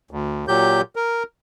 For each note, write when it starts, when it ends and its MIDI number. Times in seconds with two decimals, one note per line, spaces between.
0.11 0.45 38
0.48 0.81 46
0.48 0.81 54
0.48 0.81 67
0.48 0.81 91
0.96 1.23 70